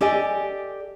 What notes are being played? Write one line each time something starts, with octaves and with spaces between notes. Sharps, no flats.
G4 A4 D5 D#5 G#5